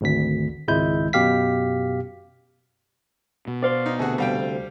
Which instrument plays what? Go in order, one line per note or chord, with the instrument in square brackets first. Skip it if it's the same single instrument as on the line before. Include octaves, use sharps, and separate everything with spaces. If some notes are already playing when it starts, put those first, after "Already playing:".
[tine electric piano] G#1 D2 B6
G#1 C#2 G#3 E4 G6
F#2 B2 G4 F5 B6
[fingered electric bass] B2
[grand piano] C5 [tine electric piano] D5 F5 C6
[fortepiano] D#4
[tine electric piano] D2 C3 A4 [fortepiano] F#4 G#4
[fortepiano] G3 F5 G5